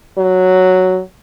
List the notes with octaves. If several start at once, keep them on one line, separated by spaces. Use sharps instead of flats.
F#3